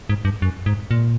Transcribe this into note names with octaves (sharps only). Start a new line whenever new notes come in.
G#2
G2
F#2
G#2
A#2